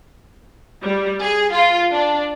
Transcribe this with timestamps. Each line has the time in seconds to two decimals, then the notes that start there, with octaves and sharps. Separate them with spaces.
0.82 G3
1.22 G#4
1.53 F4
1.92 D4